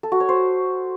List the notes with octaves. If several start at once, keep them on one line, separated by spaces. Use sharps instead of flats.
A4
F#4
C#5
C5